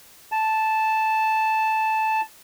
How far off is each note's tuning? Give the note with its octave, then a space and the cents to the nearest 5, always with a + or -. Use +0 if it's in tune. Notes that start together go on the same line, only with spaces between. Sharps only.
A5 -5